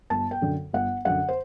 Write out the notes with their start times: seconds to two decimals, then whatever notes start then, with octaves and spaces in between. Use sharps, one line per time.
0.10 G1 A5
0.31 G5
0.41 F#2 D3
0.73 G1 F#5
1.05 F#2 D3 F#5
1.29 C5